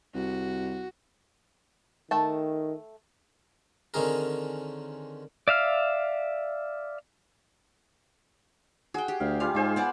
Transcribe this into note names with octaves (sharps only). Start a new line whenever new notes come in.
C2 F#4
D#3 A3 G5 A5
D3 D#3 C4 C#4 G#4 A#4
D5 E5 F5 F6
F#4 G#4 G5
G4
D2 F5
G3 F4 G#4 F5
G#2 G#4 C5 G#5
B3 D5 F#5